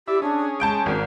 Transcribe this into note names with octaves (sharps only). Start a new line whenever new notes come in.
E4 G4 D5 E5
C#4 D4 G#4
G#3 A5 G6 D7
G#1 A#4